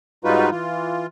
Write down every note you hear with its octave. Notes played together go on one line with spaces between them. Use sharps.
G#2 G3 D#4 F4 F#4 B4
E3 F4